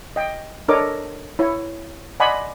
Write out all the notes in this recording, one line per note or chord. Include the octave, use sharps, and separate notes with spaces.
D#5 G5
D4 A4 A#4 C#5 D#5 D6
E4 C#5
D5 D#5 F#5 G#5 B5 C6